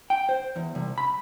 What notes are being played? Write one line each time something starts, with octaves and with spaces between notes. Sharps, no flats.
G5
C5
E2
C2
B5